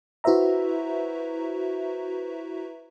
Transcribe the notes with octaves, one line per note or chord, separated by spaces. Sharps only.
E4 F#4 B4 C5 E5 A#5